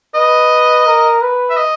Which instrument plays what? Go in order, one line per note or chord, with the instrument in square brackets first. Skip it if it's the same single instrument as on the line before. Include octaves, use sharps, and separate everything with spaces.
[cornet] B4 [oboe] D#5
[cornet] A#4
B4
[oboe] E5
D#5